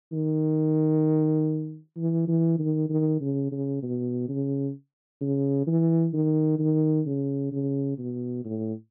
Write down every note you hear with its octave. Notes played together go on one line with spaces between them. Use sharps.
D#3
E3
E3
D#3
D#3
C#3
C#3
B2
C#3
C#3
E3
D#3
D#3
C#3
C#3
B2
A2